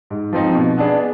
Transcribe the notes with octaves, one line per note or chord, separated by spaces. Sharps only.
G#2
F3 C4 D#4
B2
B3 D4 G#4